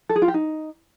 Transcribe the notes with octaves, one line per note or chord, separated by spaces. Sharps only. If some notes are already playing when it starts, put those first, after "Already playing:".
A4
G#4
F4
G4
D#4